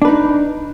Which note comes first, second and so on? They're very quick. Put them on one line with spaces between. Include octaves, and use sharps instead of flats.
D4 B4 D#4